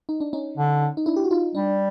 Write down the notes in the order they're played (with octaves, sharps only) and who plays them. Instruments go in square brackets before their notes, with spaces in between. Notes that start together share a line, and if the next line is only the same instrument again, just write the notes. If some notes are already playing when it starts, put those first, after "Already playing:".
[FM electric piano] D#4
D4
C#4 D#4
[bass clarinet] D3
[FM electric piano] D#4
D4 E4
G4
F#4
D#4 F4
[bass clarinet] G3 [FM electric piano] D4